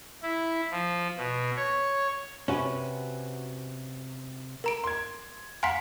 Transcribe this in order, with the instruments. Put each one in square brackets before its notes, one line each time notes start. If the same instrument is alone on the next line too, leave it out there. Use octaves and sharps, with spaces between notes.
[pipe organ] E4
F3
B2
C#5
[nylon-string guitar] C3 [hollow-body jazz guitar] C#4 F#4 B4
[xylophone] A#4 A#5 D7
[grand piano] C6 G#6
[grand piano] F5 F#5 C6 [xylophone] G#5 A#5 B6